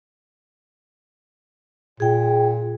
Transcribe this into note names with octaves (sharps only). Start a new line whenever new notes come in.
A#2 G#4 G5